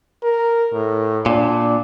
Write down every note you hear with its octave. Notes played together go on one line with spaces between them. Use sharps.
A#4
A2
A#2 D4